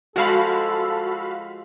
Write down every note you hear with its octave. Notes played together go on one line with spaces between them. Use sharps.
F3 G#3 F#4 A4 F5 A5 B5